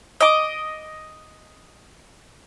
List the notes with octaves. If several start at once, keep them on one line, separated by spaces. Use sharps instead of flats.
D#5 D6